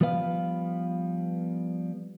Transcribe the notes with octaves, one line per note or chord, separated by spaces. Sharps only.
F3 G3 B3 B4 D#5 F5